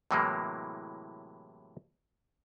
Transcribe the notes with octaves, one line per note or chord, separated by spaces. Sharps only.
A2 C3 E3 F#3 G#3 A#3